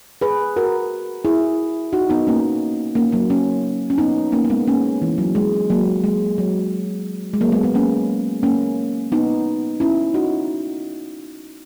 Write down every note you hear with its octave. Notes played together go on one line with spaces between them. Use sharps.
G#4 B4
F#4 A#4
E4 G#4
D#4 F#4
B3 D#4
A#3 C#4
A#3 C#4
F#3 A#3
A#3 C#4
C#4
B3 D#4
A#3 C#4
A#3
G#3 B3
A#3 C#4
E3
F#3
G#3
F#3 A#3
G#3
F#3
G#3
F#3 A#3
G#3 B3
G#3 B3
A#3 C#4
A#3 C#4
B3 D#4
C#4 E4
D#4 F#4